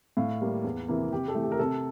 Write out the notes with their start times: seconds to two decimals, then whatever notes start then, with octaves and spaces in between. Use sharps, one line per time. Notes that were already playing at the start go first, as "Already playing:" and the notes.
0.17 A2 F5
0.41 G3 A#3
0.64 E2
0.88 C3 E3 A#3
1.12 C3 G4
1.28 A4
1.35 E3 A3
1.43 G4
1.52 A#4
1.59 C3 A4